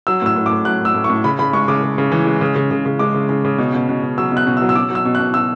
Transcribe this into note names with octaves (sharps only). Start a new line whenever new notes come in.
F#3 E6
A2 E6
A2
D6
A2
F#3 F#6
A2 E6
A2
C#6
A2
C#3 B5
C#3 B5
G#3 C#6
C#3 D6
C#3
C#3
E3
G#3
C#3
C#3
C#3
C#3
G#3 D6
C#3
C#3
C#3
B2
B2
B2
B2
F#3 E6
B2
F#6
B2
E6
F#3
E6
F#3 D6
F#3
E6
B2
F#6
B2
B2 E6